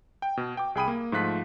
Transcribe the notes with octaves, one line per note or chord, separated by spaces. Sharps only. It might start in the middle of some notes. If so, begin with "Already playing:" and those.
G5
B2
G5 D6
C2 G#4 G5 B5 D#6 D#7
A#3
G#2 F3 A3 F4 F#6 B6